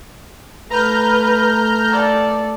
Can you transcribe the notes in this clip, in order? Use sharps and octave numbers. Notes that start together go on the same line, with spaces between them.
A3 B4 A#5 F6 G6
A4 D5